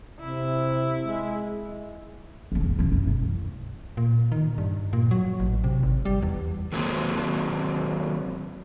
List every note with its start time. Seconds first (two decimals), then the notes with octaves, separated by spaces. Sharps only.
0.20 C3 E4
1.01 G#3
2.52 C#3 B3
2.64 F2
2.79 C#3 F3
2.92 F#2 E3
3.07 E1
3.97 A#2
4.32 D#3
4.58 G2
4.93 A#2
5.11 F#3
5.40 A1
5.64 C3
5.83 G#1
6.05 G3
6.22 E2
6.72 D#3 F#3 G#3 A#3 C4